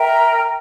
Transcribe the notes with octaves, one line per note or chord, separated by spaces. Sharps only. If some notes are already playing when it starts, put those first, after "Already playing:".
Already playing: A#4 E5 G5 A#5